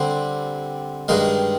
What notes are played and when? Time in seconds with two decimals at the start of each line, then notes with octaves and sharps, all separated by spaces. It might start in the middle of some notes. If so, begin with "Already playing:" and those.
Already playing: D3 G3 C4
1.08 G2 D#3 G#3